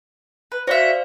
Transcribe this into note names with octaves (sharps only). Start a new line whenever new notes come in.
B4
F#4 C5 D5 E5 F5